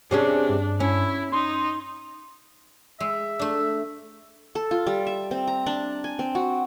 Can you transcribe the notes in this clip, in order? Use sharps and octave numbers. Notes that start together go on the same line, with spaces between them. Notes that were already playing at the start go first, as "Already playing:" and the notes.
C3 C#4 D4 G#4
G2
C#4 E4
D#4 C6
G#3 E5
A3 D4
A4
F4
G3
E5
C4
A#5
D4
G#5
C4
F#4